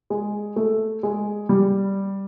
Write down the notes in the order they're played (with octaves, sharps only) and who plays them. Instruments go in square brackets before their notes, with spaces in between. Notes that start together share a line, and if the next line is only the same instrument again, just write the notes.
[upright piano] G#3
A3
G#3
G3